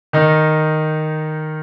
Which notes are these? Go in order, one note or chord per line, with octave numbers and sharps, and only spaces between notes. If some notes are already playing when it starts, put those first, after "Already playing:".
D#3 D#4